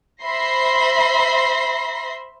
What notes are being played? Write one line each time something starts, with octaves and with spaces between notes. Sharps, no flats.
C5 E5 B5 C6 A#6 C7